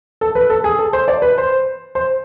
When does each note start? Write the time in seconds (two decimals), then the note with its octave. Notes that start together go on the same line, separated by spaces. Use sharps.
0.21 A4
0.35 B4
0.50 A4
0.64 G#4
0.79 A4
0.93 C5
1.08 D5
1.22 B4
1.38 C5
1.95 C5